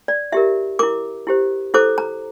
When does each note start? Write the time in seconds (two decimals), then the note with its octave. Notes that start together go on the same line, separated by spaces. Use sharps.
0.08 D5
0.32 E4 G4 A#4 E5
0.79 E4 A#4 D6
1.27 E4 G4 C5
1.74 E4 A4 C5 D6
1.98 A#5